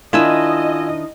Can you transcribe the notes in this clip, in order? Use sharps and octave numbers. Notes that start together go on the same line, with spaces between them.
D#3 D4 E4 F4 D#5 G#5 E6